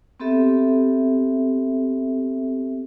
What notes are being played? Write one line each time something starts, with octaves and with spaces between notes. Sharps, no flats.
B3 C4 G4 A4 E5